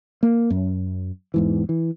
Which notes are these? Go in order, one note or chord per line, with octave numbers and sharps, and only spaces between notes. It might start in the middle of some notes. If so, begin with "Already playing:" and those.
A#3
F#2
E2 G#2 E3
E3